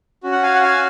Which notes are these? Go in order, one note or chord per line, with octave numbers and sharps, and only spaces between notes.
C#4 F#4
F#5
F5 G#5
F#5
F5 G#5